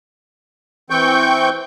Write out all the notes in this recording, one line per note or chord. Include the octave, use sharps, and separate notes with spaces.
E3 C4 G5 C#6 G6